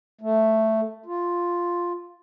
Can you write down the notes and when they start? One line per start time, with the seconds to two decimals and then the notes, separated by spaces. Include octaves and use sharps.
0.21 A3
1.06 F4